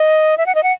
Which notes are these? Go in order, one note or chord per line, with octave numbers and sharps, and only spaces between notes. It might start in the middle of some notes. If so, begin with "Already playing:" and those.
Already playing: D#5
E5
F#5
D#5
F#5